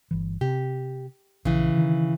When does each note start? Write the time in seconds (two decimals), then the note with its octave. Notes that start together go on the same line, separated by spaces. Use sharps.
0.11 G1 E3
0.41 C3 G4
1.45 A#1 C#3 E3
1.77 D#3